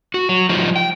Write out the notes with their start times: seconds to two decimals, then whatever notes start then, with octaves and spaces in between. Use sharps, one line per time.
0.14 F#4
0.29 F#3
0.49 F3 G3 D#4 F4
0.76 G5